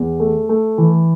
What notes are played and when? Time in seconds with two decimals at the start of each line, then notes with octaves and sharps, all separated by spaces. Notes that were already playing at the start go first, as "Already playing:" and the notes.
Already playing: E2
0.20 A3
0.49 A3
0.78 E3